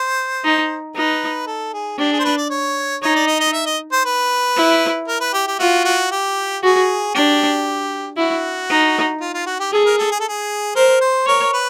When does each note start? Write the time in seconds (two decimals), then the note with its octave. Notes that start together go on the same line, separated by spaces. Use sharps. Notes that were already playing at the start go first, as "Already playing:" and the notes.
Already playing: C5
0.44 D#4
0.95 D#4 B4
1.47 A4
1.73 G#4
1.98 D4 G4
2.12 G#4
2.19 C5
2.24 B4
2.37 D5
2.50 C#5
3.02 D#4 C#5
3.15 D5
3.27 D#5
3.41 D#5
3.53 E5
3.66 D#5
3.92 C5
4.05 B4
4.57 E4
5.08 A#4
5.21 B4
5.33 G4
5.47 G4
5.59 F4 F#4
5.85 F#4
6.11 G4
6.62 F#4 G#4
7.15 D4 G4
8.17 E4 F#4
8.70 D#4
9.21 F4
9.34 F4
9.46 F#4
9.60 G4
9.72 G#4 A4
9.85 A#4
9.98 A4
10.11 G#4
10.20 A4
10.28 G#4
10.75 A#4 C5
11.01 C5
11.27 A#4 C#5
11.53 B4